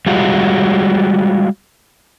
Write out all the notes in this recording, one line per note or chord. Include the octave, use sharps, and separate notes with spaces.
G3 G#3 F4 F#4